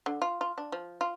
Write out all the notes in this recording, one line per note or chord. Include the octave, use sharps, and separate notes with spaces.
D3
F4
F4
D4
F3
F4